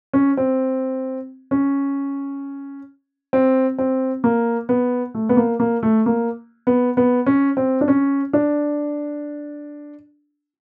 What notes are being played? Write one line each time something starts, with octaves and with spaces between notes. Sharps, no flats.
C#4
C4
C#4
C4
C4
A#3
B3
A3
B3
A#3
A#3
A3
A#3
B3
B3
C#4
C4
D4
C#4
D4